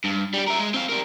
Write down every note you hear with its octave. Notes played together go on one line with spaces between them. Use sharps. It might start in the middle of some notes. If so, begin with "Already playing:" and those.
G2
G3 G4
A#4 E5
G#3
C4 F5
G3 A#4